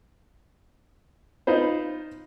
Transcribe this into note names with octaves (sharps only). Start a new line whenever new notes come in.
D#4 F4 B4 C5